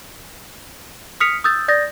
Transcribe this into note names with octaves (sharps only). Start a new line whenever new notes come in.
D#6 F6 B6 C#7 F7
D#6 E6 G6 A6
D5 D#6 G6 A6 A#6